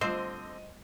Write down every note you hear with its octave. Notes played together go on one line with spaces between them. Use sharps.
D3 G3 A3 C4 F4 C5 D#5